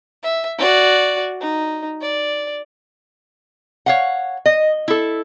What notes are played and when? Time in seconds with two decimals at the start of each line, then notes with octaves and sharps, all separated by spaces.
0.23 E5
0.58 F#4 D5
1.40 D#4
2.02 D5
3.86 C#5 F5 F#5
4.46 D#5
4.88 E4 A4